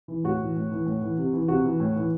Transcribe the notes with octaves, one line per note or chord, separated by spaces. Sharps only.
E3
A2 F#4
E3
A2
E3
A2
E3
C3
E3
C3 F#4
E3
A2
E3